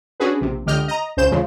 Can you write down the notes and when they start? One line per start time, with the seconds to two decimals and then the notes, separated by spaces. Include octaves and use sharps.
0.20 C#4 D4 F#4 G#4 B4
0.41 A#1 C3
0.66 C#2 D3 G4 D#5 F6 G6
0.88 D#5 A#5
1.17 C#2 C#3 C5 G6 E7
1.31 E2 C#3 F3 G#3